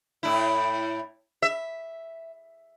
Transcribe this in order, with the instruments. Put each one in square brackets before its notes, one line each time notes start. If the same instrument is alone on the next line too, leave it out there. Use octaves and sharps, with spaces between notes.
[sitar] A2 E4
E5